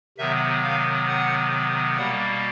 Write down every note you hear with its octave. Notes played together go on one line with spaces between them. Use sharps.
C3 D#3 F#3 B3 E5
F5
F#5
B2 G3 A#3 F#5